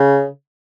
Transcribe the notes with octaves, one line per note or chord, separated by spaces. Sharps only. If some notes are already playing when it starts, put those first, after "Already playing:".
Already playing: C#3